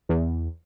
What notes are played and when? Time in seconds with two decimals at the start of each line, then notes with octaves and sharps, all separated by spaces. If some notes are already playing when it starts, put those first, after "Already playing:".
0.09 E2